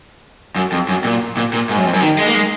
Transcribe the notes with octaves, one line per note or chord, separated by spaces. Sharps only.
F#2
F2
F#2
A#2
A#2
A#2
G#2
F#2
F2
F#2
D#3
G#3
A#3
G#3